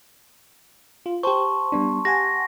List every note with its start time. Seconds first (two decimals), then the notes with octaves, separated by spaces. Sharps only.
1.06 F4
1.23 G4 C5 A5 C6 C#6
1.72 G3 B3 D4
2.05 G4 F#5 G#5 A#6